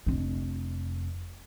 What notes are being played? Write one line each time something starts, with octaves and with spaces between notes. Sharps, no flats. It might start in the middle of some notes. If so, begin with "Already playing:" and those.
F1 D4